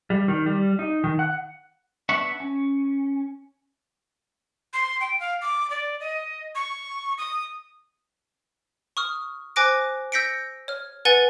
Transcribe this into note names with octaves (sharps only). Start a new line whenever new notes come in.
G3
D#3
G3
D#4
D#3
F#5
B3 D4 E5 F#5 C#6
C#4
C6
G5
F5
D6
D5
D#5
C#6
D#6
C#6 D#6 F6
C5 G#5 D6 F#6 A#6 D7
E6 G6 A#6 B6 C#7 D7
C#5 F6
B4 F#5 G#5 A6 D#7 G7